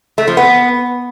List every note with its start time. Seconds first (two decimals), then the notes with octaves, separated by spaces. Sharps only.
0.18 A3
0.27 F3
0.37 B3